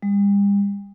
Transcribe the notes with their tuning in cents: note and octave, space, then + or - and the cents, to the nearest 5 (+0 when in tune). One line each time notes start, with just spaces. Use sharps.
G3 +40